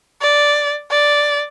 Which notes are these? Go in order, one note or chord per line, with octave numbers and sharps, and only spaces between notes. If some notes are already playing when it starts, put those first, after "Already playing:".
D5
D5